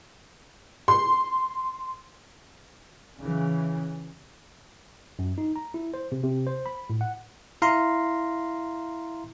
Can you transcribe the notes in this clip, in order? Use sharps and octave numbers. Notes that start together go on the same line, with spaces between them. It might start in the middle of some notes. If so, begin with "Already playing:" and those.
C6
C#3 E3
F#2
D#4
A#5
E4
C5
C3
C3
C5
B5
A2
F#5
E4 F5 A#5 C6